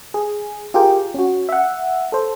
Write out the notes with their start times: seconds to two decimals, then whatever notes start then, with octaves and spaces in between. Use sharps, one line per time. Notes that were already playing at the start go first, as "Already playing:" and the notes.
0.14 G#4
0.74 F4 G4 G#4 A#4 G5
1.14 C#4 F#4
1.49 E5 F#5
2.12 A4 C5